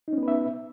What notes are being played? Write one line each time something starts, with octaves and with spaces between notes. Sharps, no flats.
B3 C#4 D#4 B4 E5